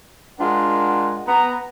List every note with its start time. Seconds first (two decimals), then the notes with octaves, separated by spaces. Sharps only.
0.39 G#3 D4 F4 A#4 F#5
1.28 B3 A#5